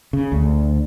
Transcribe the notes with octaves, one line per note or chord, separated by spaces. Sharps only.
C#3
D2